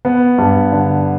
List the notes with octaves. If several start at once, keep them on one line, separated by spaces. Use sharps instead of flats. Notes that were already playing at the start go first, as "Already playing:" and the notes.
B3
G2
D3